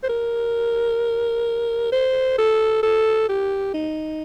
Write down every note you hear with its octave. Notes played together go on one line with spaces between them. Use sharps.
C5
A#4
C5
A4
A4
G4
D#4